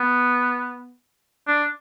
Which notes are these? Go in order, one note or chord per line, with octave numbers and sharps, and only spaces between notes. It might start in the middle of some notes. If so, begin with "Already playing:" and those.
Already playing: B3
D4